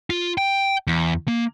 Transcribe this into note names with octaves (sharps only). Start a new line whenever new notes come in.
F4
G5
E2
A#3